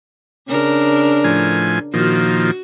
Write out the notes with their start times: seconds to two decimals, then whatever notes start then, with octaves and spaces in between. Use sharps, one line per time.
0.48 C#3 D4 A#4
1.24 A2 F3 G#5
1.94 A#2 D#3 F3 F#4